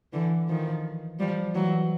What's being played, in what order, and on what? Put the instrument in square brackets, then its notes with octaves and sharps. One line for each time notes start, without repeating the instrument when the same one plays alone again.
[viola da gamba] D3 E3
D#3 F3
F3 G3
E3 F#3